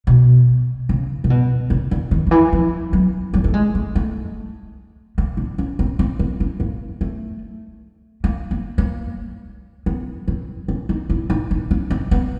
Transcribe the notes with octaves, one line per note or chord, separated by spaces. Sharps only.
B2
C#3
C3
B2
C#3
D3
D#3
D#3
E3
F3
F#3
F#3
A3
G#3
A3
A3
A#3
D4
C#4
C4
C4
B3
C#4
A#3
A3
A#3
A#3
A#3
B3
C4
C#4
D#4
E4
D#4
D4
C#4
C4
B3